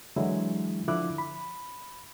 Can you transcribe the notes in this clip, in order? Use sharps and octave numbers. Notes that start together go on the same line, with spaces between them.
D3 E3 F#3 G#3 E4
D3 F3 E4 D6 F#6
B5